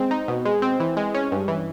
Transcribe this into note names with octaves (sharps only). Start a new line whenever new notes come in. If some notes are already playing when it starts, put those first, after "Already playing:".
Already playing: G#3 C4
D#4
B2
G#3
C4
E3
G#3
C#4
G2
E3